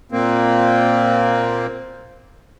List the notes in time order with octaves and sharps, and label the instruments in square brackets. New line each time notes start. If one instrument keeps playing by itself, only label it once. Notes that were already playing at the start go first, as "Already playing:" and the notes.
[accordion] A#2 A#3 C4